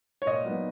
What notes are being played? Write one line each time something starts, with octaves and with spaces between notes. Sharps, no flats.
C#5
A#2 D#5
F#3 B3 D#4